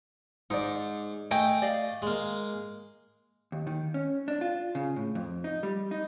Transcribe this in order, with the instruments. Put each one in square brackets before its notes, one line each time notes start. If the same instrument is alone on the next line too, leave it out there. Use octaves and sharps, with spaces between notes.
[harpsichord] G#2 [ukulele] D#4 D5
[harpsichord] A3 [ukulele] D#5 G5 G#5
[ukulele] D5 D#5 F5
[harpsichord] G#3 A#3
[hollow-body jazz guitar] D#2
D#3
C#4
D4
F4
C#3
A2
F2
D#4
G3
D#4